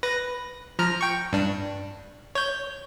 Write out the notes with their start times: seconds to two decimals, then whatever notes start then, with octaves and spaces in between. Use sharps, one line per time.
0.03 B4 A#6
0.79 F3 A#5 F6
1.01 G5 C#6
1.33 G2 D4
2.35 C#5 G6